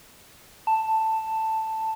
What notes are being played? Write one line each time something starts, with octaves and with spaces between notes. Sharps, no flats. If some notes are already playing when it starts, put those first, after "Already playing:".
A5